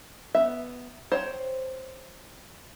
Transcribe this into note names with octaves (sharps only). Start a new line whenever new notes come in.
B3 E5
C5 C#5 G5